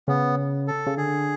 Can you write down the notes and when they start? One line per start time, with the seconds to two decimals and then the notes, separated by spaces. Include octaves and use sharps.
0.08 C#3 B3
0.68 A4
0.87 C#3
0.97 D3 G#4